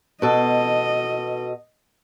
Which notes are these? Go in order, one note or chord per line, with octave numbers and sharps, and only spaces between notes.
B2 A4 D#5